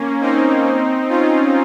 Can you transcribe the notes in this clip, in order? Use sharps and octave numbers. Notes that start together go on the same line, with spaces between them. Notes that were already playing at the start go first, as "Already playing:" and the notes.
Already playing: A#3 C#4
C4 D#4
C#4 F4